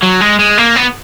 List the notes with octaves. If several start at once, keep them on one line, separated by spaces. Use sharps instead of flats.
F#3
G#3
G#3
A#3
B3